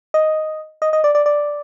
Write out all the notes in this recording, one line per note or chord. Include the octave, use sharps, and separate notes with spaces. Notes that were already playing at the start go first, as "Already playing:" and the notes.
D#5
D#5
D#5
D5
D5
D5